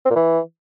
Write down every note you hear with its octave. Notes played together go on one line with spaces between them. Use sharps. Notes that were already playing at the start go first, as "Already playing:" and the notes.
C4
A#2
E3